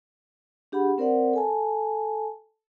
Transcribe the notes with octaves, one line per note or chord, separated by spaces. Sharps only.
D4 G4 G#4 F#5 B5
C4 A#4 C5 D5 F#5
A4 G#5 A5